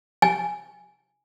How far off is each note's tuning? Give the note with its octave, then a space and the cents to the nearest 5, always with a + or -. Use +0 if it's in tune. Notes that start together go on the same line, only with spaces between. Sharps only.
G#5 +0